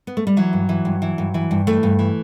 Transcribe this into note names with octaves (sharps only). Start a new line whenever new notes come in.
B3
A3
G3
E3 F#3
G2
E3
G2
E3
G2
E3
G2
E3 A3
G2
E3